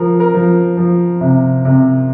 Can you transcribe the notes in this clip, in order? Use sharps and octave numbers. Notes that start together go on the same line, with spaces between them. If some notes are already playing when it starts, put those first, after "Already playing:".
Already playing: F3 A#4
A#4
F3
F3
C3
C3